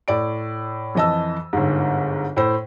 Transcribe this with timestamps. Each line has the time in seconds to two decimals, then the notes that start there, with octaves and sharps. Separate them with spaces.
0.08 A2 D5 D7
0.95 F2 E3 D#5 A5 E6
1.53 G1 G#2
2.37 A2 C5